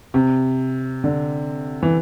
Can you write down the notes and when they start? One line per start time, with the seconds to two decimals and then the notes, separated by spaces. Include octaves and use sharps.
0.14 C3
1.04 D3
1.83 E3